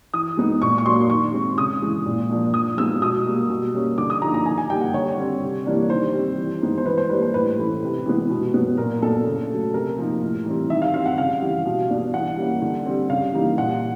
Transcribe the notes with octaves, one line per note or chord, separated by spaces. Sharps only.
E3 D#6
G#3 B3 D#4
A#2 C#6
C#6
F#3 A#3 D4 C6
D#3 C#6
G#3 C4
C#3 D#6
E3 G#3
A#2
F3 A#3 D4
F3 D#6
G#3 B3 D#4 E6
B2 D#6
G3 A#3
B2
G3 A#3 C#4
D3 D6
D#6
F3 A#3 D#4 A#5
A#5
D#3 G#5
G#5
G3 A#3 D#4 G5
F#5
D3 C#5
G3 C4
C3
E3 G3 A#3 D4
D#3 C5
G3 C4
E3
G#3 B3 D#4
C5
E3 B4
C5
G3 A#3 D4 B4
C5
A2 B4
E3 A3 C#4
C3
E3 G#3 B3
B2
F#3 B3
A#2 A#4
F#3 B3 D4 A4
C#3
F#3 A3
C3 A#4
F3 A#3 D#4
A2
E3 G3 C4
D#3 E5
F5
G3 C4 F5
F#5
C#3 F5
E3 G3
B2
G3 B3 D4
E3 F#5
G3 A#3 C#4 E4
D3
G3 C4
C#3 F5
E3 G3 A#3 D#4
A#2 F#5